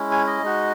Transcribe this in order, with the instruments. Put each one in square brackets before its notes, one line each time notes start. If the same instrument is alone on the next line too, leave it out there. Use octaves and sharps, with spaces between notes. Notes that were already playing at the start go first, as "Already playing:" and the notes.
Already playing: [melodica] G#3 C#4 E4
G#5
D#5
G#3 D#4 F#4